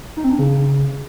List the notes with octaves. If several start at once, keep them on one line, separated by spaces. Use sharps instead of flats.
D#4
C4
D4
C#3